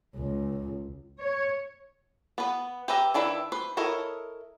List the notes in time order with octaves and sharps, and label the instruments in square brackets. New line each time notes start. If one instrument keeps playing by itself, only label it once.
[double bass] C#2
[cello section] C#5
[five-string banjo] B3 B4
G4 B4 E5 A#5
D#3 D4 E4 B4 E5
B4 C5
E4 A4 A#4 C#5 D#5